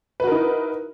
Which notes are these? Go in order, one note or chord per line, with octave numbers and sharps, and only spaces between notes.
D#4 E4 F#4 A#4 B4